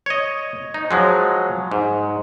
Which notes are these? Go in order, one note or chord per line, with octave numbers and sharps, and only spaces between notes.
C#5 D#5
D#4
F3 F#3 G#3
G#2